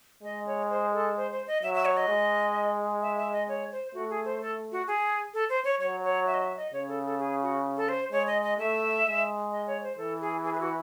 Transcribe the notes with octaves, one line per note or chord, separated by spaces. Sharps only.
G#3 D#5
C#5
C5
A4
C5
C5
D#5
F#3 E5
E5
C#5
D#5
G#3
E5
E5
D#5
C#5
C5
A3 F#4
G#4
C5
A4
F#4
G#4
A4
C5
C#5
F#3 C#5
C#5
E5
D#5
E5
D#5
C#3 C#5
A4
A4
G#4
F#4
A4
C5
G#3 C#5
D#5
D#5
A3 E5
G#3
D#5
C#5
C5
E3 A4
G#4
G#4
G#4
F#4